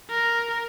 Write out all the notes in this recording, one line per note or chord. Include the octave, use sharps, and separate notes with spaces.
A#4